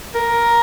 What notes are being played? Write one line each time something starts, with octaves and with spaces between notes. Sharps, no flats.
A#4